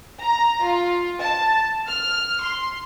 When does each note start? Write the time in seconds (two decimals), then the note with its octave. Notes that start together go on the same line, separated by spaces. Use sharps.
0.21 A#5
0.64 F4
1.21 A5
1.88 F6
2.42 C6